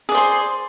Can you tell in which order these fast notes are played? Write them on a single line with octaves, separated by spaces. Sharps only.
G#4 D5 C5 C6